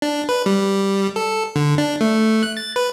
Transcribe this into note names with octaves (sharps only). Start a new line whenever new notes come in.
D4
B4
G3
A4
D3
D4
A3
F#6
A6
B4